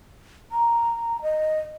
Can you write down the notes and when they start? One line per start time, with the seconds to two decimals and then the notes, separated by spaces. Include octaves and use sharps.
0.52 A#5
1.22 D#5